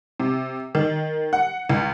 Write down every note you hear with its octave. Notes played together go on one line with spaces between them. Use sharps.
C3
D#3
F#5
C#2